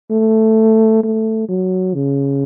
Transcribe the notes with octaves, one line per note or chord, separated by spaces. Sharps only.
A3
A3
F#3
C#3